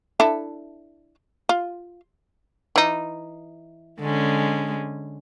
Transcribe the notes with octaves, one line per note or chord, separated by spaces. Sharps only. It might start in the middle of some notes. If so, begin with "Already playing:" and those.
D4 E4 A4
F4
E3 D#4
D3 G#3 C#4